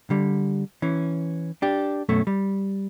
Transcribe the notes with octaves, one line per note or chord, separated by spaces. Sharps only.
D3 G3
E3 C#4
D4 G4
F#2 B2 A3 C#4
G3